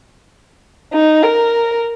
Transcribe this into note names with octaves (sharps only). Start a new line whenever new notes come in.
D#4
A#4